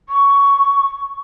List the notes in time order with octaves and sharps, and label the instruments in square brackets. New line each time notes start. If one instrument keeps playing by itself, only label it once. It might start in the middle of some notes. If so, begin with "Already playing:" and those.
[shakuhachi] C#6